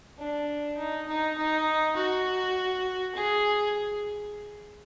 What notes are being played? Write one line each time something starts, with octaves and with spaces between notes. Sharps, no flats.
D4
D#4
D#4
D#4
F#4
G#4